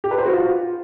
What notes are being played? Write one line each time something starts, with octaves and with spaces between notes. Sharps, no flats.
G4
B4
C5
F#4
F4